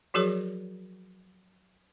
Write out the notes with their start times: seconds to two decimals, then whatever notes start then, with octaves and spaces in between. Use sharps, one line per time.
0.14 F3 F#3 F#4 G#4 A#4 C#5